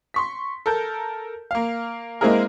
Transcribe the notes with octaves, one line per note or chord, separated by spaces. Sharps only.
C6 C#6 B6
A4 A#4 G6
A#3 F5
G#3 A#3 C4 E4 G#4 A#4